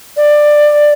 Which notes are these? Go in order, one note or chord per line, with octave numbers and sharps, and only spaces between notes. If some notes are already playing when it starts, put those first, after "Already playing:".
D5